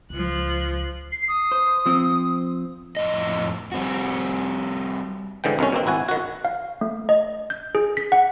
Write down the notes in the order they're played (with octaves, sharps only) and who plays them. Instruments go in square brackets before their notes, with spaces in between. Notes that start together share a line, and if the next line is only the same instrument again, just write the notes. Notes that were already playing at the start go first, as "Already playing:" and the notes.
[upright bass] C#2 [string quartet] F3 F#6
[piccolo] C7
D#6
[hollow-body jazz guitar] C5
F3 C4
[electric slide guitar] F2 A2 D#5
G3 C4 F#4
[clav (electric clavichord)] G#2 D3 E3 G5
C2 D#3 C#4
B2 A#3 C4
G#1 E4 F#4 G#5
D#3 F#4
[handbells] F5
A3
D#5
G6
G#4
B6
F#5